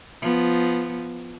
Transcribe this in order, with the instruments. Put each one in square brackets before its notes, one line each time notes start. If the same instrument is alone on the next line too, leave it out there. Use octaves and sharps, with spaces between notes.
[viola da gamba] F3 B3